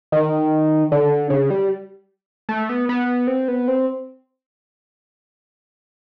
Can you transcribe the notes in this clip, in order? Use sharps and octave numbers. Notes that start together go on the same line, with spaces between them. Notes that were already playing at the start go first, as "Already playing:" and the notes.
D#3
D3
C#3
G3
A3
B3
B3
C4
B3
C4